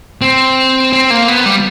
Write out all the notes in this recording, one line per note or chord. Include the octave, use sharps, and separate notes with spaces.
C4
C4
A#3
B3
G3